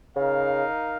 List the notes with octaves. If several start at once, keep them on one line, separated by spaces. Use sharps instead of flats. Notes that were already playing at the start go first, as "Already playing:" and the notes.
C#3 D#4 A#4 F5